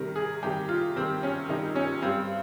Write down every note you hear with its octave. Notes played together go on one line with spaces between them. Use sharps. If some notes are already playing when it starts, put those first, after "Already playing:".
Already playing: C3 D#3 G3 A#4
G#4
C3 D#3 G3 G4
F4
C3 D#3 G3 C4
C#4
C3 D#3 G3 D#4
C#4
G2 G3 C4